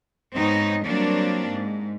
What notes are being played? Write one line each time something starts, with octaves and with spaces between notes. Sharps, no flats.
G#2 B3 C4 D#4 C#5 D#5
F#3 G3 A#3 C4 D4
G#2